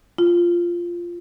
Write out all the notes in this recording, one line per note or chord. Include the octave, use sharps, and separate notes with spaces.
F4